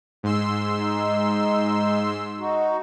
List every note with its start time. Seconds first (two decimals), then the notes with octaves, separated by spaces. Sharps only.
0.23 G#2 C6 E6
0.79 D#4
2.39 D#4 F#4